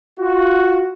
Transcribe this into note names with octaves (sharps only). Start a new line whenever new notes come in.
F4 F#4